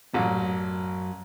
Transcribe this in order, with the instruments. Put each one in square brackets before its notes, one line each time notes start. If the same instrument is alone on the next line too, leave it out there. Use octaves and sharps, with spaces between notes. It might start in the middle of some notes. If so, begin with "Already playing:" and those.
[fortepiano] A1 A#2 [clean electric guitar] F#2 F#4